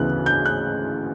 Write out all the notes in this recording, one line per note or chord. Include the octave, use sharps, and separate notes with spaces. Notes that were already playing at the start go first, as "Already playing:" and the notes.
Already playing: D2 C#3 E3 B3 F#6
G6
F#6